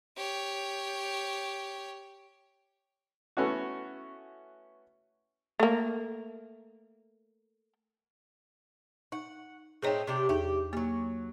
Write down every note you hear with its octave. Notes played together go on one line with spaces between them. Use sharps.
G4 C#5
A3 B3 C#4 E4 F#4
A3 A#3
D#4 F#5
A2 C4 D#4 G#4 C#5 G5
C3 D4 G4
E2 D#4 G4 G#4
F#3 G3 A#3